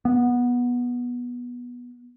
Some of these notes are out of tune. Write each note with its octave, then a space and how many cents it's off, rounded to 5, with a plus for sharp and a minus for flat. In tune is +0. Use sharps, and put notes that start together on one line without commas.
B3 -15